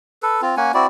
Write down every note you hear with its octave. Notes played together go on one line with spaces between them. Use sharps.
A4 B4
C4 F4
A#3 C#4 F#5 G#5
C4 E4 F#4 D5